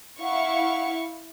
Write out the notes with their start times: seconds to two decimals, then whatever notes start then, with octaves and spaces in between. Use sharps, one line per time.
0.21 E4 F5 F#5 C#6